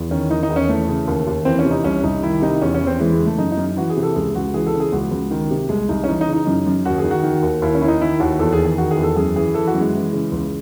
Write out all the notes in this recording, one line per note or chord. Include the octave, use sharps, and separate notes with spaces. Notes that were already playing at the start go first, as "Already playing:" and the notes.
Already playing: E2
D#3 C#4
D#3 D#4
D#4
E2
C#4
E3 A3
C#3
D#2
D#2
E3 C4
C#4
C3
D#4
C2 C#4
C2 D#4
D#3 E4
C3 D#4
E2 C#4
C#4
E2
C4
E3 G#3
G#3
C#3
A3
F#2 D#4
D#4
F#2
E3 F#4
G#4
C3
A4
C#2 G#4
C#2 F#4
E3 G#4
A4
C#3
G#4
C#2 F#4
C#2
D#3
C3
C2 G#3
C2 D#4
C#4
E3 D#4
D#4
C#3
D#4
F#2
F#2
D#2 F#4
G#4
D#3
F#4
D#3
D#2
D#2 E4
C#4
D#3 E4
D#4
D#3 E4
D#2 F#4
E2 A4
G#4
D#3
G#4
D#3 F#4
G#4
E2
A4
F#2 G#4
E3 G#4
E3 A4
F#4
F#2
G#3
E3
C#3
C#2